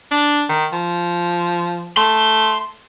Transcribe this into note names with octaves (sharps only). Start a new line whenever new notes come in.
D4
D#3
F3
A3 C6